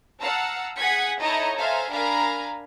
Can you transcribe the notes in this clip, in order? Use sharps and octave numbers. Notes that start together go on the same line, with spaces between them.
F5 F#5 A5 A#5 E6
G#4 F#5 G#5 G#6 B6 C#7
D#4 E4 A4 C#5 D#5 A#5
A4 C5 E5 F5 G#5 A#5
D4 A#4 F5 G#5 A#5 B5